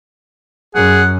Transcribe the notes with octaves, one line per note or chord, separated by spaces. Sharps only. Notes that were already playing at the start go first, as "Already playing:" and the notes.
F#2 G#4 F#5